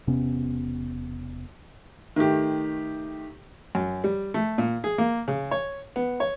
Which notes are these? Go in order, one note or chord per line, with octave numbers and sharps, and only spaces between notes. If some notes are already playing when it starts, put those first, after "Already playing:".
E1 C3 B3 C#4
D#3 A3 G4
F#2
G3
A3
A#2
G#4
A#3
C#3
C#5
B3
C#5